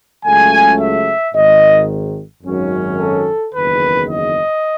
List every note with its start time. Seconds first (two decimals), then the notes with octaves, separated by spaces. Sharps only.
0.24 C#2 C#3 F#3 A3 G#5
0.80 E5
1.34 G#1 G#2 D#3 D#5
2.44 G#1 F#2 D#3 F#3 C#4
2.99 A4
3.53 F#1 E2 D#3 B4
4.08 D#5